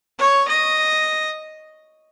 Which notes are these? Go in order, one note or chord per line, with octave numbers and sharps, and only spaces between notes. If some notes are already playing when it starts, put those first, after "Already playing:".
C#5
D#5